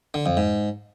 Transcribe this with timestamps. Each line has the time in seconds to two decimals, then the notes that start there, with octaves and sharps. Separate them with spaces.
0.14 D3
0.26 F2
0.37 G#2